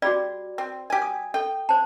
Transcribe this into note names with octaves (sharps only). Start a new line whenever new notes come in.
G3 F#4 G#4 D5
C4
G4 G#5
D#6
A4 G5
C5 A5